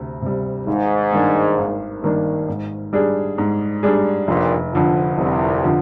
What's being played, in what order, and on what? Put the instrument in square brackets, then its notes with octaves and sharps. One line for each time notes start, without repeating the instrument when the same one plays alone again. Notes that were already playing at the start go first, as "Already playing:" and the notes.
Already playing: [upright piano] D2 C3
C3 G3
[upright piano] G#1 [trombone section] G#2
[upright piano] G2 D#3 A#3 D4
G#1
G2 D#3 A#3 D4
G#2
G3 D4 G#4
G#2
G3 D4 G#4
[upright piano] F1 [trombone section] A#1 A#2
[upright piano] F2 D3 F3
[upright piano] F1 [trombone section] C2 C3
[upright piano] D3 F3